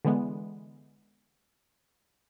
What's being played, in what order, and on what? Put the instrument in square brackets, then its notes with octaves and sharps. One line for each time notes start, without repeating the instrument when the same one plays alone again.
[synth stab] D3 E3 G#3 B3